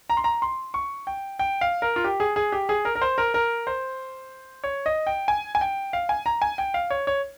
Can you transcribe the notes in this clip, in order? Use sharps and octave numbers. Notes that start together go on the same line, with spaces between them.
A#5
C6
A#5
C6
C#6
G5
G5
F5
A#4
F4
G4
G#4
G#4
G4
G#4
A#4
A#4
C5
A#4
A#4
C5
C#5
D#5
G5
G#5
G#5
G5
F5
G#5
A#5
G#5
G5
F5
C#5
C#5